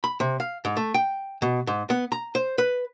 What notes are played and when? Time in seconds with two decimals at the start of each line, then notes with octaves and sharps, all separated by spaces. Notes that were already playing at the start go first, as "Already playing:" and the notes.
0.04 B5
0.20 C3
0.40 F5
0.65 G#2
0.77 A3
0.94 G5
1.42 B2
1.67 G#2
1.90 B3
2.12 A#5
2.35 C5
2.58 B4